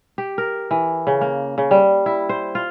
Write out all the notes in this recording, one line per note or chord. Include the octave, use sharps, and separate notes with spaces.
G4
A#4
E3
C#3
A#3
C#3
G3
E4
C5
F4